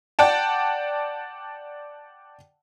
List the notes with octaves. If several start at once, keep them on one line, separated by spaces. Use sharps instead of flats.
D5 F#5 G5 A5